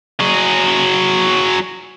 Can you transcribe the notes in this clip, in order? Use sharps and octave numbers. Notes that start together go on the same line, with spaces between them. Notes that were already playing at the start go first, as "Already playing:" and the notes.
F#3 G#4